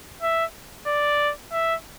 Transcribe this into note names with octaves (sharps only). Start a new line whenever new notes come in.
E5
D5
E5